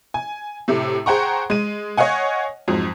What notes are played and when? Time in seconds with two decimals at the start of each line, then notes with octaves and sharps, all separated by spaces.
0.14 G#5
0.68 A2 C3 A3
1.06 G#4 C5 F#5 G5 A#5 C#6
1.50 G#3 D#7
1.97 C#5 D#5 F5 F#5 G#5
2.68 F2 G#2 F#3